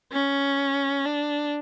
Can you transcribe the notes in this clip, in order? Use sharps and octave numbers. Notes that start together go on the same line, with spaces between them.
C#4
D4